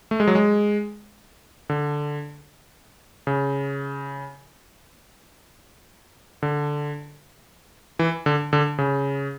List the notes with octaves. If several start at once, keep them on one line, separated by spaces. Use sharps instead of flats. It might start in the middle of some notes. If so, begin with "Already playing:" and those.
A3
G#3
F#3
G#3
D3
C#3
D3
E3
D3
D3
C#3